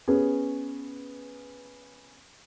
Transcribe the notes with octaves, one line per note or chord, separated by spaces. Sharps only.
B3 C#4 G#4